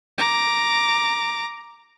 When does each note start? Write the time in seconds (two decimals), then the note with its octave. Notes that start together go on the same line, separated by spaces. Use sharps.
0.18 A#5 D6